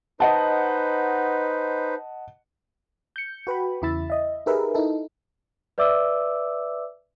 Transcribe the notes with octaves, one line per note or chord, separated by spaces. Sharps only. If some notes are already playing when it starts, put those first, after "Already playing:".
D#4 B4 C5 D#5 F#5 A5
G6 C#7
F#4 B4 G5 B5
E2 C#3 E4 B5 E6 A6
D#5 E5
D#4 G4 G#4 A#4 B4 E5
D#4 E4 A4
B4 D5 E5 D6 E6